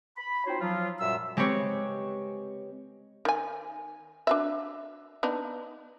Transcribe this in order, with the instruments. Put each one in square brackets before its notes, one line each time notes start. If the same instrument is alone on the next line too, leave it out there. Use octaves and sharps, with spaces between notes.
[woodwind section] B5
C4 D#4 F4 F#4 C5 C#5
F3 F#3 F4
F#2 A#2 G3 E5 E6
[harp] G#3 C4 G4 B4 C#5
[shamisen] D#3 G#5
D4 F#4 E5
B3 D4 D#4